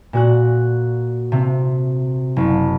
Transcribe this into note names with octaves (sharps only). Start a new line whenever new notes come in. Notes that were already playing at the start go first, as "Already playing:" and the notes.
A#2 F#4 F#6
C3
F#1